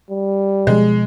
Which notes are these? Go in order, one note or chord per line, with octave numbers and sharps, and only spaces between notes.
G3
B2 F3 G#3